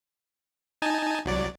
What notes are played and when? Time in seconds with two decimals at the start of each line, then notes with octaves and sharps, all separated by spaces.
0.82 D#4 G#5 A5
1.25 C2 F#3 D5